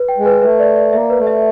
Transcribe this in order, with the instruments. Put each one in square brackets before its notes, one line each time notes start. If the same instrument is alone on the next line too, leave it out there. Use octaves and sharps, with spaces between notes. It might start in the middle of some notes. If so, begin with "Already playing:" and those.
Already playing: [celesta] B4
G5
[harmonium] G#3
[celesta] B4
[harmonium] A3 [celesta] B4
[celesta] D5
D5
[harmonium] A#3 [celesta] E5
[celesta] B4
[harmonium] A3
[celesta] E5